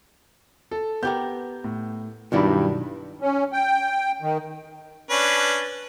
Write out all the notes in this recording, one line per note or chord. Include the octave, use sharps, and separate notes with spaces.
A4
B3 G4 A#4 G6
A2
B1 G2 D#3 E4 F#4 D5 B5
C#4
G5
D#3
C#4 D4 B4